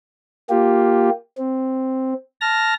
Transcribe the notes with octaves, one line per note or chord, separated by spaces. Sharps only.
A#3 F4 G4
C4
A5 F6 A#6